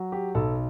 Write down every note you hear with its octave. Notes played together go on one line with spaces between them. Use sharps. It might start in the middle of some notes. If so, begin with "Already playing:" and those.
Already playing: F#3
G4
B1 A4